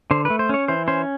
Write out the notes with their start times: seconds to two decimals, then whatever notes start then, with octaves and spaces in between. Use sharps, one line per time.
0.11 D3 C5
0.25 B4
0.30 A3
0.39 C5
0.49 C#4 C#5
0.68 E3 C5
0.88 C#4 C5